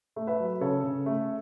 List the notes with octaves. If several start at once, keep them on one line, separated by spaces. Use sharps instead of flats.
A3
B4 E5
F#3
C#3 A4 C#5
C#3
A3